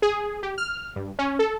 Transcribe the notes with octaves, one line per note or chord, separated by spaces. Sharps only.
G#4
G4
F6
G2
C#4
A4